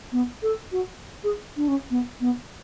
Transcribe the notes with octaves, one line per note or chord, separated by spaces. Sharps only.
B3
A4
F#4
G#4
D4
C#4
B3
B3